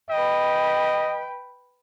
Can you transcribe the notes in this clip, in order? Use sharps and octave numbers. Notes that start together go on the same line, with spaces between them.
B4 D#5 G5